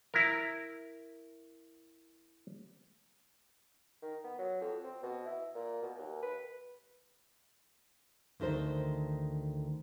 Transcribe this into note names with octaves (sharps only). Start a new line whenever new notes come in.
E4 A#4
D#3
B3
F#3
F2
C4
B2
E4
A#2
B2
D#2
B4
D2 D#3 A4 C5